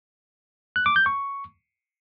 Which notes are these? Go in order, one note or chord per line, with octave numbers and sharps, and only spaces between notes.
F#6
D6
G6
C#6